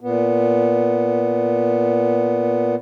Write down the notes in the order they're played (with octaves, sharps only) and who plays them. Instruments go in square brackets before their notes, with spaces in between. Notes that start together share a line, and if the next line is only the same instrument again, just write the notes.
[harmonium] A#2 B3